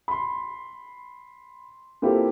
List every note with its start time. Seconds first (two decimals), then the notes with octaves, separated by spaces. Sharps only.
0.08 B5 C6
2.02 A#3 C4 E4 F4 G4 A4